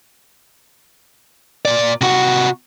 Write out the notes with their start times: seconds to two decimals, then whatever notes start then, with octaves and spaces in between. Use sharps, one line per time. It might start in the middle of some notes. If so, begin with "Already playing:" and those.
1.65 A#2 D5
2.01 C3 F#4